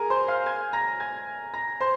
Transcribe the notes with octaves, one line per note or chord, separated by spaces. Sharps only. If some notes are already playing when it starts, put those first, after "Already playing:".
Already playing: G#4 A#4 G#5 A#5
C5 C6
F5 F6
G#5 G#6
A#5 A#6
G#5 G#6
A#5 A#6
C5 C6